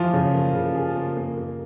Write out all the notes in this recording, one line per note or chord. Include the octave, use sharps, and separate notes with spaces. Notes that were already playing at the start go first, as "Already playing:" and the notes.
Already playing: E3 F3 F4
C#3
A#3
C#3
G#4
A#3
A#3
A#3